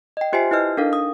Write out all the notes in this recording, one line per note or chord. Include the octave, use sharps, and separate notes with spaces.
D#5 G5
F4 G4 C5 E5 G#5 C7
E4 B4 D#5 F6 G6
D4 D#4 A4 A#4 F5
D#6